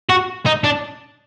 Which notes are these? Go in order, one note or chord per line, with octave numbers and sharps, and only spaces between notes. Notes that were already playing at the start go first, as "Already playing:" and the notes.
F#4
D#4
D4